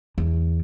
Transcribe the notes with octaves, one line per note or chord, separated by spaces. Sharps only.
E2